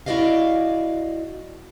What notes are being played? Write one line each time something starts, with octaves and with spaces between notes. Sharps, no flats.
E4 F#4 G4 D5 D#5 F5